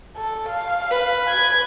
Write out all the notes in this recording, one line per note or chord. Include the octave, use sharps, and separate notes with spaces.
A4
F5
B4
G#6